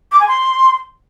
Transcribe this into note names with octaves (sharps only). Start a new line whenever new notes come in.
D6
G#5
C6